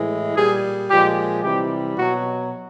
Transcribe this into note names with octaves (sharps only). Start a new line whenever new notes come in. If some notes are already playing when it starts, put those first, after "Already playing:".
Already playing: A2 E3 G#3
A#2 G3 G#4
A#2 F3 G#3 G4
C3 E3 G3 G4
B2 F#3 F#4